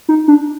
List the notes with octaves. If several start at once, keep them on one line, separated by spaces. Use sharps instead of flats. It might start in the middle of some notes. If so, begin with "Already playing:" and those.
D#4
D4